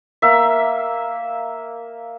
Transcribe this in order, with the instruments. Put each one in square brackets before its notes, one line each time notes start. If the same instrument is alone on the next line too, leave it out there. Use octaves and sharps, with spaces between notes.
[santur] A#3 E5